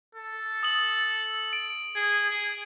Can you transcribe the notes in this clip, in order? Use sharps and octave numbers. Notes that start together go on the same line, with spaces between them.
A4
D#6 F#7
D7
G#4
G#4